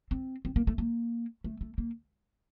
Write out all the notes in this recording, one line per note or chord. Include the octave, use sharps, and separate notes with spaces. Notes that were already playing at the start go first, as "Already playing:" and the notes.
C4
C4
A#3
A3
A#3
A3
A3
A#3